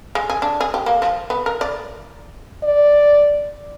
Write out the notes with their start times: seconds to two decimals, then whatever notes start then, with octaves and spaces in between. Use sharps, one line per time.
0.15 G#3
0.30 G#4
0.42 D4
0.60 G#4
0.74 G4
0.86 A#3
1.02 F3
1.30 B3
1.46 A#4
1.61 D5
2.63 D5